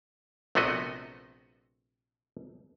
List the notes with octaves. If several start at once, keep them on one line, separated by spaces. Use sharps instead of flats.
A#1 C3 A3 B3 F#4 D#5